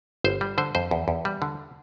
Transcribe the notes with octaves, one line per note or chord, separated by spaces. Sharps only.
G1 C5
G3
D3 C5
F2 C5
E2
E2
G3
D3